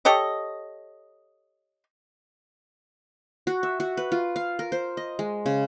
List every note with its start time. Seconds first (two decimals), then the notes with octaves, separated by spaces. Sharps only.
0.05 G4 A4 C#5 D#5
3.47 F#4
3.63 E5
3.80 F#4
3.97 B4
4.12 F4
4.36 F5
4.59 A#4
4.72 C5
4.97 D#5
5.19 G#3
5.46 C#3